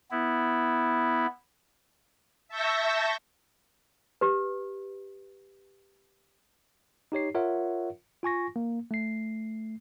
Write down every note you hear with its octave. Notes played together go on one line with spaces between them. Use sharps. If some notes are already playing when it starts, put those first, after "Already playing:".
B3 E4
E5 A5 C#6 E6 G6 A#6
G4 B4
D#4 G4 C#5 C7
F4 A#4 C#5 E5 F#5
F4 G#5 C#6 A#6
A#3
A3 C7